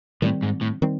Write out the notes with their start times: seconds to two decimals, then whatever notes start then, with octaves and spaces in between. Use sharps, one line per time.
0.22 A2 D#3 G3 C4
0.43 G#2
0.61 A2
0.82 D#3 G3 C4